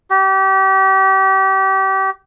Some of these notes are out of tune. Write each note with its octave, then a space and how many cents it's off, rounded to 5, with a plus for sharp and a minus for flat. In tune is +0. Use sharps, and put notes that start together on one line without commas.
G4 -30